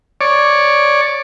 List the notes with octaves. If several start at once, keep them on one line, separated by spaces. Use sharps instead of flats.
C#5 D5